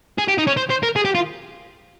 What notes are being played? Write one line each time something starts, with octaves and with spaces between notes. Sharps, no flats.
G#4
G4
D#4
C#4
C5
C5
A#4
G#4
G4
F4